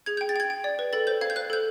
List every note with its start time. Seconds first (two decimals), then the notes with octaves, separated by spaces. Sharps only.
0.06 G#4 G#6
0.17 G6
0.21 G5
0.29 A6
0.36 G5 G#6
0.50 G5
0.64 D5
0.79 B4
0.93 A4 A6
1.07 C5 G6
1.21 F5 G#6
1.30 G6
1.36 C5 F#6
1.50 A4 G6